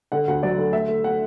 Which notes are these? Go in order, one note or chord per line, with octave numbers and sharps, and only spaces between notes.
D3 F#5
D2 F#5
F#3 D5
D3
A3 E5
A3
F#5